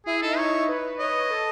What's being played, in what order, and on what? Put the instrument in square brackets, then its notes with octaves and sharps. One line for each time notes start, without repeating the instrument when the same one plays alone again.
[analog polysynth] E4 E5 [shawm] G#4
[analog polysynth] D#4 D#5 [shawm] A4
[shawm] C#5
[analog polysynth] B4
B4
[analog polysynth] C#5 [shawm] D#5
[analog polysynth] A4 A5